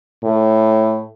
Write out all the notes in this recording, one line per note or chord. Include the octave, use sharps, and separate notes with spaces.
A2